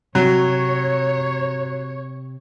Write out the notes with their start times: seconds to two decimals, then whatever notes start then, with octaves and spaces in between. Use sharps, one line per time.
0.15 C3 F#3 C#5